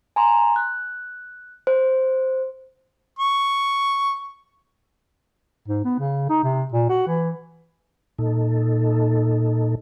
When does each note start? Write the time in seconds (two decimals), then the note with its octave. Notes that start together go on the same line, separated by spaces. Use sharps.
0.16 G#5 A#5 C6
0.56 F#6
1.67 C5
3.19 C#6
5.68 G#2
5.85 B3
5.99 C#3
6.30 D#4
6.44 C3
6.72 A#2
6.89 F#4
7.07 E3
8.18 A#2 D#4 A4